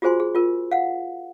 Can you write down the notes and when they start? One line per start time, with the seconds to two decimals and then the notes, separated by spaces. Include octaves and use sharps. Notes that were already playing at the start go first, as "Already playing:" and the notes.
0.02 F4 F#4 G#4 C5 G#5 C6
0.20 G#4
0.35 F4 A#4
0.72 F5 F#5